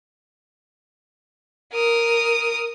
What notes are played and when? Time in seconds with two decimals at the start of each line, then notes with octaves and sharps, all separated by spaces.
1.73 A#4 D#6